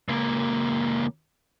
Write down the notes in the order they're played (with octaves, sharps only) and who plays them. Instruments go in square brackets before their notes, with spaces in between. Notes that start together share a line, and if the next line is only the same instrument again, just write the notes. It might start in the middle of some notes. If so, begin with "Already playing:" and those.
[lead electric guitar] C#2 A#3